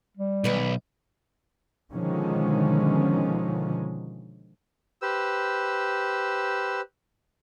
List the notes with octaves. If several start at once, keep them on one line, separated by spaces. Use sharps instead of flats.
G3
B1 D#3 B4 D5
B2 D3 D#3 F3 G#3 C#4
G4 B4 C5 E6